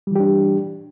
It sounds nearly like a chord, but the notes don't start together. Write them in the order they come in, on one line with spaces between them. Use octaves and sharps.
G3 E3 G4 D4